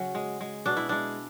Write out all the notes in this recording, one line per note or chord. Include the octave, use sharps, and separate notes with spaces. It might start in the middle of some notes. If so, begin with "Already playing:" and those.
Already playing: C#3 F#3 C#4
G#3
G#3
B2 D4
E4
G#3 D4